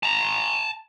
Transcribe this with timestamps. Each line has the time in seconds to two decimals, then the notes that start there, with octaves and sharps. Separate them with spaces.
0.03 A5 A#5